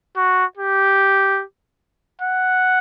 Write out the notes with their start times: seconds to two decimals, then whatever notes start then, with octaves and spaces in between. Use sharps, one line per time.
0.16 F#4
0.57 G4
2.21 F#5